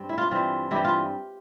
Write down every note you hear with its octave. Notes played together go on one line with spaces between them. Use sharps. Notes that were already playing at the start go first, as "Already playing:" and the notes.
Already playing: G2 C4
E4
F4
G2 E3 G3 C4 F4
G2 E3 G3 C4 E4 G4
F4